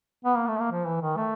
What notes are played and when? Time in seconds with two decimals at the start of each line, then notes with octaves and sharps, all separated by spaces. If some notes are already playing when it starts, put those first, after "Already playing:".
0.25 B3
0.36 A#3
0.48 A3
0.59 A#3
0.71 F3
0.86 E3
1.02 D#3
1.17 A3